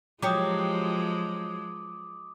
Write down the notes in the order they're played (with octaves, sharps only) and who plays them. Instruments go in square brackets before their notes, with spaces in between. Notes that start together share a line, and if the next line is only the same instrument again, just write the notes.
[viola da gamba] F3 G#3 [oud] F#3 G4 C#5 [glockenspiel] D6 D#6